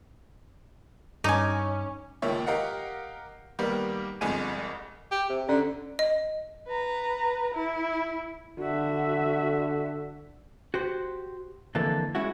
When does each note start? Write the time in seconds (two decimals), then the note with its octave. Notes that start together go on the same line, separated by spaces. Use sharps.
1.24 G2 C#4 D#4 G#5 D6
2.22 C#2 A#2 D#3 C#5 E5
2.46 G4 A#4 D#5 F5 F#5
3.59 D#3 G3 A#3 B3
4.21 G1 C2 F2 G#3 G#5 D#7
5.11 G4
5.29 C3
5.49 D3 C#4 D5
5.99 D#5
6.68 B4 A#5
7.54 E4
8.59 D3 F#4 E5
10.74 F#4 G4 C5
11.75 F2 D3 E3 A#3 D4 A4
12.15 G#3 C#4 E4 F#4